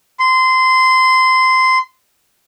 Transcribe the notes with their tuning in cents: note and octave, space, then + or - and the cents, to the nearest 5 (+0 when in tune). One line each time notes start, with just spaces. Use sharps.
C6 -20